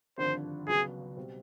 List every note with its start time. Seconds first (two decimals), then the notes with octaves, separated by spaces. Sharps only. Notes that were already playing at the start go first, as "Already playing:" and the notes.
0.18 G#1 G2 D3 F3 C5
0.68 C#2 C#3 F#3 B3 G#4
1.17 B2 G3 C4